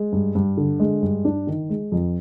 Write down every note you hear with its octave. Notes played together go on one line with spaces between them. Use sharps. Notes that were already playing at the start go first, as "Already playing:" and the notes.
Already playing: G#3
G2
G2
D3
G#3
G2
D4
D#3
G#3
F2